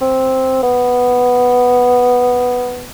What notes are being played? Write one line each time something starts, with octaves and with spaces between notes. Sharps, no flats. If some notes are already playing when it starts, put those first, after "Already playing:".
C4
B3